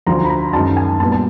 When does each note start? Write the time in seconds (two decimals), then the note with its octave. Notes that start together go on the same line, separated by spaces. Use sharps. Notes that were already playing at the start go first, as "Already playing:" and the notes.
0.06 D2 D3 F3 A#5
0.25 B5
0.30 A#5
0.49 A#5
0.53 F#2 D#3 G#3 A5
0.77 G#5
1.00 A#2 G3 B3 A5
1.12 A5